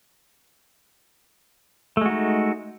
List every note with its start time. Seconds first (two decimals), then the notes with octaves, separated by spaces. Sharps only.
1.97 A3
2.01 G#3
2.06 F#4
2.10 D#4